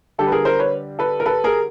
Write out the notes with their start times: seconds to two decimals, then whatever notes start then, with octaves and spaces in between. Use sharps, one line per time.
0.18 D3 G3 G4 A4
0.27 B4
0.32 G#4 A#4
0.45 A#4 C5
0.59 B4 C#5
0.99 A4 B4
1.20 A#4
1.26 A4 B4
1.44 G#4 A#4